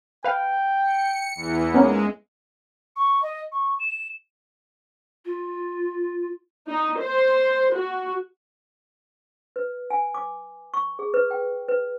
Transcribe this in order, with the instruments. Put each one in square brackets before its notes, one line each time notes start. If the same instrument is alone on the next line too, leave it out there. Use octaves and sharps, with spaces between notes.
[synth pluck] B4 F5 [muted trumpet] G5
[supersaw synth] C#7
E2 E3
[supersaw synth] G#3 [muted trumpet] A#3 [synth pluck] B3 C#4 D#4
[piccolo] C#6
D#5
C#6
E7
[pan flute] F4
[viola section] D#4
C5
F#4
[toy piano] B4
G#5
D6
C#6
G#4
B4
G5
B4